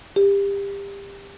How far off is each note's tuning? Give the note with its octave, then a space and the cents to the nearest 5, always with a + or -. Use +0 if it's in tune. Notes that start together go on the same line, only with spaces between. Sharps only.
G4 +25